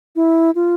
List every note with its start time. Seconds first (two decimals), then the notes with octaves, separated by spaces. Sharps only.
0.16 E4
0.55 F4